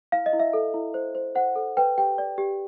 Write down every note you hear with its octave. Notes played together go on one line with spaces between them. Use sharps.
E4 F5
D#5
E4
E5
A4
E4
C5
C5
C5 F#5
A4
B4 G5
G4 G5
D5
G4